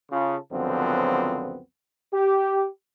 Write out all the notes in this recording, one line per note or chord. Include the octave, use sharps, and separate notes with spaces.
C#3 F4 A4
C#2 F#2 D3 F3 B3 C4
G4